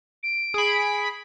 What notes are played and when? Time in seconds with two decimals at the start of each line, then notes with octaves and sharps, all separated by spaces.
0.23 D7
0.54 G#4 B5